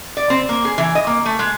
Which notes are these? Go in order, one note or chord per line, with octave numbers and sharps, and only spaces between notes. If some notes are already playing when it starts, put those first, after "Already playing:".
D5
C4
A#3
G#4
E3
D#5
A#3
A3
G#3